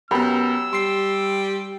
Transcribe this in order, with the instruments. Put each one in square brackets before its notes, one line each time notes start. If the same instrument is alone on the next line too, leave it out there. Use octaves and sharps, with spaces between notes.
[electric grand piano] F#2 B3 [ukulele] G4 A#5 B5 [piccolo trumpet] E6
[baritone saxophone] G3 [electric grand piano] C6 C7